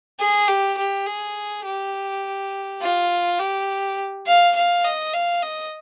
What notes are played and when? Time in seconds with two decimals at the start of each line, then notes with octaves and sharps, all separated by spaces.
0.20 G#4
0.48 G4
0.78 G4
1.07 G#4
1.65 G4
2.81 F4
3.39 G4
4.26 F5
4.55 F5
4.84 D#5
5.13 F5
5.43 D#5